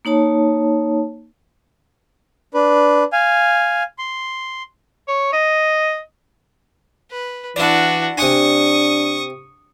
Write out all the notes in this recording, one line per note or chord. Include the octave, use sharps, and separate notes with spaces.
A#3 D#4 C#5 A5
D4 B4
F5 G#5
C6
C#5
D#5
B4
E3 D4 E4 F#4 D5
C3 D4 F#5 G#5 C#6 D#6